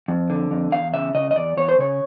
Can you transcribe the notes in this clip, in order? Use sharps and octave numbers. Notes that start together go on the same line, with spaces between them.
F2
D3
F2
E2 F5
C#3 E5
C#3 D#5
D#5
E2 D5
E2 C#5
C5
C#3 C#5